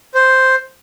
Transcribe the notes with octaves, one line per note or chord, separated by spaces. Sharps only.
C5